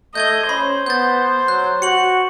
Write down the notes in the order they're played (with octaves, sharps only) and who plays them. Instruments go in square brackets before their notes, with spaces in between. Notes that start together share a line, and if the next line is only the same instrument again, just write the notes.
[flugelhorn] A3 [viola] D#5 [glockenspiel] G6 G#6 G7
[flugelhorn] C#4 [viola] C5 [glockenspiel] B5
[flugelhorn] B3 [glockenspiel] G6 A6
[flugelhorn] F#3 [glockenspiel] F#6
[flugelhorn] F#4 [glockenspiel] C#7 F#7